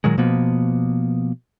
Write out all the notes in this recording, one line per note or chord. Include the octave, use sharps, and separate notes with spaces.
A#2 D#3 F#3 G#3
B2 F3 A#3 B3